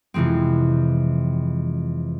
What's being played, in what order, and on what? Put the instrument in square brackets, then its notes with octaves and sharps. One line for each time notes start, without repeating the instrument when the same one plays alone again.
[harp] F2 C3 E3 G#3 C4